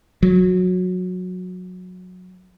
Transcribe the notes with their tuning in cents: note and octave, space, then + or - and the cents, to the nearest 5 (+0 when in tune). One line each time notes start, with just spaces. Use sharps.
F#3 -20